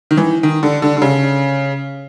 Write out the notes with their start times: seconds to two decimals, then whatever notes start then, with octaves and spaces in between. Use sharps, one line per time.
0.11 D#3
0.17 E3
0.43 D#3
0.63 D3
0.82 D3
0.97 D3
1.02 C#3